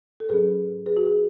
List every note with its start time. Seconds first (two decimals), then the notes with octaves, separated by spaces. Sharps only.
0.20 A4
0.29 G#2 F#3 C#4 G#4 B4
0.86 G#4 B4
0.97 F#4
1.06 G#4